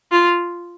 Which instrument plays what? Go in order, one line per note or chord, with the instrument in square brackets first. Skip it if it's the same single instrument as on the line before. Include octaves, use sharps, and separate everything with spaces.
[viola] F4